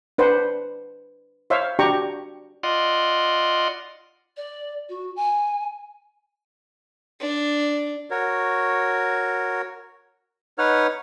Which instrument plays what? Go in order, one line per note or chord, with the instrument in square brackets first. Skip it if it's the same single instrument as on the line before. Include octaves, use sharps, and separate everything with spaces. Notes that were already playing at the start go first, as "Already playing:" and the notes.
[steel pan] D4 B4 C5 F#5
C5 C#5 E5 F5
D4 F#4 G4 G5 A#5 C#6
[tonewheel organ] F4 D5 D#5 F#5 C6
[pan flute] D5
F#4
G#5
[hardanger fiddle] D4
[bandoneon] F#4 A#4 C#5
D#4 B4 C#5 F#5 F6